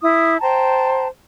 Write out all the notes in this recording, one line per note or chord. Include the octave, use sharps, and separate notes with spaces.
E4 D#6
C5 G5 A5 A#5